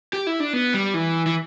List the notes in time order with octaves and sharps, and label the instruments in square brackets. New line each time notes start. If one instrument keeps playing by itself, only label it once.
[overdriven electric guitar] G4
E4
D4
B3
G3
E3
E3